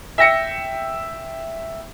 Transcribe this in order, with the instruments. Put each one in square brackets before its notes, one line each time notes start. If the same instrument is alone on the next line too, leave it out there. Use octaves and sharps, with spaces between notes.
[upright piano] E5 G5 A#6 C#7